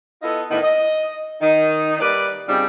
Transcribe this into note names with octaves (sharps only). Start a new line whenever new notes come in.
B3 E4 F4 A4 D#5
A2 D3 D#3 A#3 B3 E4
D#5
D#3 D#4
G3 A#3 B4 D5
C#3 G3 C4 D4 D#4 F4